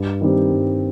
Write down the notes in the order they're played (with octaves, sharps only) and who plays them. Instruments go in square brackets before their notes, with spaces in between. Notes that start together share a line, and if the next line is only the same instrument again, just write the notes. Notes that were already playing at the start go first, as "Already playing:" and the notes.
Already playing: [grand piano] G2
D#3 G3 C4 G4
G2